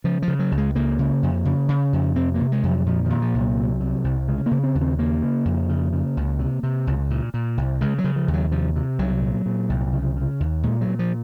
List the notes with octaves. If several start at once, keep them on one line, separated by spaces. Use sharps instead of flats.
C#3 F3
F3
C#3
F#3
C#2
G#3
C#3 A#3
C#3
F2
C#3
C#3
F2
C3 C4
A#3
C3
G#3
F2
F#3
A#2 F3
D#3
A#2
F3
C2
F#3
C3
C3
C2
C#3 G#3
A#3
C#3
C4
D#2
C4
C#3 A#3
C#3
F2
C#3
C#3
C#2
C3
C3
C#2
A#2
A#2
C2
C#3 G#3
F#3
C#3
F3
D#2
F#3
C3 F3
C3
C2 F#3
A#2
A#2
C2
C#3
C#3
D#2
A#2 G#3
F#3
A#2
F3